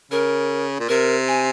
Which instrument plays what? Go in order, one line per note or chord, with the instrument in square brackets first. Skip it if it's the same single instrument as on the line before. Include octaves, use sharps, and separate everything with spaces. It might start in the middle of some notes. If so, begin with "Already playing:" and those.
[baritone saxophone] C#3 [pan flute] A#4
[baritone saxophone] A#2
[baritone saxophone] C3 [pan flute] A#4
[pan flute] G#5